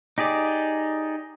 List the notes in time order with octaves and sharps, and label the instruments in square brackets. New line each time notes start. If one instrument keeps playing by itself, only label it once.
[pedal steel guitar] D#4 G4 G#4 D5